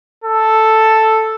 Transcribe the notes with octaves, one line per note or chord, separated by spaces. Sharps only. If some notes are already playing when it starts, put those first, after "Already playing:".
A4